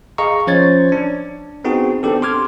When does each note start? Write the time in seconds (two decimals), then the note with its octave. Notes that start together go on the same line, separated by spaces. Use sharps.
0.18 G#4 D#5 F5 A#5 C#6
0.47 F3 C#4 C5 C#5 G#6 A6
0.92 D4
1.64 B3 C4 D#4 F#4 G#4
2.03 B3 C4 D4 G4 A4
2.22 C6 D6 F6 G#6